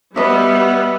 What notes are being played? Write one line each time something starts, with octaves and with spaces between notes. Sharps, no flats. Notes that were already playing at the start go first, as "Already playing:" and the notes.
G3 B3 B4 D#5 E5